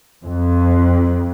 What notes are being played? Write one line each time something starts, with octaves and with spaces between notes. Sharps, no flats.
F2